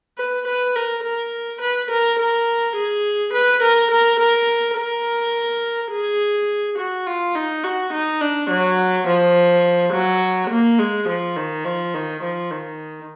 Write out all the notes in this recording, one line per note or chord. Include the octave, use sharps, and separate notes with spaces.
B4
B4
A#4
A#4
B4
A#4
A#4
G#4
B4
A#4
A#4
A#4
A#4
G#4
F#4
F4
D#4
F#4
D#4
D4
F#3
F3
F#3
A#3
G#3
F3
D#3
F3
D#3
F3
D#3